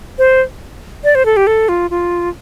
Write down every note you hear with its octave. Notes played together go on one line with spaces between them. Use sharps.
C5
D5
C5
A4
G4
A4
F4
F4